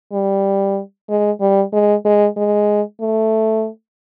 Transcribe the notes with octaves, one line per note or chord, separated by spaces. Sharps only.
G3
G#3
G3
G#3
G#3
G#3
A3